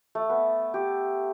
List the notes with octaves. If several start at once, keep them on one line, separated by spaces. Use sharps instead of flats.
A3
B3
G4